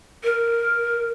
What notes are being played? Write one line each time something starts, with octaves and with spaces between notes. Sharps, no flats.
A#4